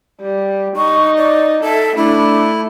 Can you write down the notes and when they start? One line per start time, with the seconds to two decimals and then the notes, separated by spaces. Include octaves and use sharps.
0.21 G3
0.76 D#4 C#6
1.17 D5
1.64 A4 E5
1.97 A3 D4 E4